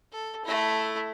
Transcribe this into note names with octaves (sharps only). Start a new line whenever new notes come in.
A4
A3 E4